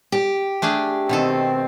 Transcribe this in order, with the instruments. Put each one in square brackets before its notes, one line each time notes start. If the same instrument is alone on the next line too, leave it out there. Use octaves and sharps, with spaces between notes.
[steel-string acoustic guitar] G4
[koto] A3 D4 G#4
[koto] B2 D#3 A4 [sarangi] C4